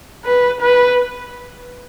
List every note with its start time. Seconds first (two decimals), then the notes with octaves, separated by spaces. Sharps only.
0.25 B4
0.62 B4